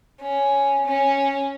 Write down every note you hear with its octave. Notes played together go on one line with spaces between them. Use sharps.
C#4
C#4